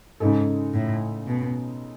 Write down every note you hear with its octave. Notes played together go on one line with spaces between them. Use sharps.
G#2 C#3 G#3 D#4 A4
A2
B2